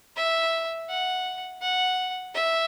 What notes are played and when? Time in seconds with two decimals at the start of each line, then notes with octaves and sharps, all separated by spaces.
0.16 E5
0.89 F#5
1.62 F#5
2.34 E5